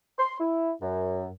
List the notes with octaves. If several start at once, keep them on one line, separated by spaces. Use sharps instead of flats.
C6
E4
F#2